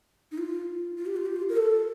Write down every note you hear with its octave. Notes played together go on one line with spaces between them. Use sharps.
D#4
F4
F4
G4
F4
G4
F4
A#4
A4